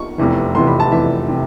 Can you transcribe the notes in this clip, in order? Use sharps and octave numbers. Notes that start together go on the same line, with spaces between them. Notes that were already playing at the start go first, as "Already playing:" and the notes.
Already playing: C#6
F1 E2 C3 E3
F1 E2 C3 E3 C6
B5
A5
F1 E2 C3 E3 E5
C3 E3